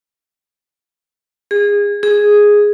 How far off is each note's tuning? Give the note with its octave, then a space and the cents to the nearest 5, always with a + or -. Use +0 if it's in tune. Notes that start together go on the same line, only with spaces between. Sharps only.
G#4 -25
G#4 +0